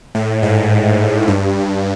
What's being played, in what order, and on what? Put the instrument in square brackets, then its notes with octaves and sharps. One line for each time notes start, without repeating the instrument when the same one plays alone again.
[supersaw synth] A2
G#2
G2